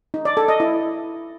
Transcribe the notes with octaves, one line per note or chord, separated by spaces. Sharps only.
D#4
D5
A4
D#5
E4